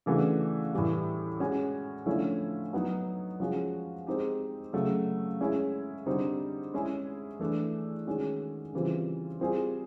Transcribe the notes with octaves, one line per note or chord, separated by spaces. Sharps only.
C#3 E3 A3 D4 F#4
A2 E3 G3
G#3 C#4 F#4
D3 F3 A3 C#4 E4
F#3 B3 D#4
F3 G#3 C#4 F#4
G#3 C4 D#4 G4
C#3 F#3 A3
G#3 C#4 E4 G#4
D3 G3 C4 D#4
G#3 C#4 E4 G#4
E3 A3 D4
D#3 G#3 C#4 F#4
C#3 E3 G3 C4 F4
G3 C4 F4 G#4